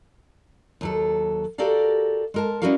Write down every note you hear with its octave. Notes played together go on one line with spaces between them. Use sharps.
D#2 F#3 A4
F#4 G4 A4 A#4 D5 F5
G#3 A#4 A5
G3 C#4 E4 F#4 A#4 F5